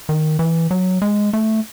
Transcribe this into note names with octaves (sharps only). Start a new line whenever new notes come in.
D#3
E3
F#3
G#3
A3